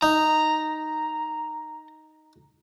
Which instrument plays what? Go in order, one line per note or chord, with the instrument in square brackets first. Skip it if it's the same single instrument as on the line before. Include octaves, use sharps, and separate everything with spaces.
[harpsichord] D#4 [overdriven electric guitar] A#5